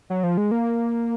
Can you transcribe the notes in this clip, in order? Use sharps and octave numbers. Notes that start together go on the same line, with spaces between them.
F#3
F3
G#3
A#3